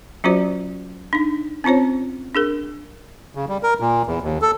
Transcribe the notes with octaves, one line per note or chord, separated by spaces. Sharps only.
F#3 C#4 F4 F#4 C5 D5
D4 D#4
C4 C#4 F4 C5 C#5
D4 G#4 A#4
C#3
G3
A#4
A#2
E2
D#2
A4